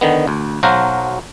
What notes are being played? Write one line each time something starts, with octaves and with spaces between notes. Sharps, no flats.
D3 D#3 B3
D2
B1 F#3 F#4 C5 F5 A#5